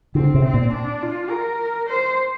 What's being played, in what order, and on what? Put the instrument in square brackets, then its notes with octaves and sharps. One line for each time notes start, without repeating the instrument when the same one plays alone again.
[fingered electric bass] D3 [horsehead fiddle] C4
[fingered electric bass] C3
[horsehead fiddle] C4
[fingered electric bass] A#2
[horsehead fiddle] D4
F4
A#4
C5